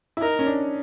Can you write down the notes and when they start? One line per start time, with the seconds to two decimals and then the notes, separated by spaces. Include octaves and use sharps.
0.17 E4
0.21 D#4 A#4
0.39 C#4
0.46 D4